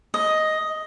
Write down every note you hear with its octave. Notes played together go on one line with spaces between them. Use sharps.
D#5